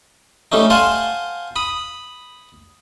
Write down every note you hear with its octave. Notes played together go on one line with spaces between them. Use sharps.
G3 A3 C#4 D#4
C5 F5 F#5 G#5 A5 C6
B5 D#6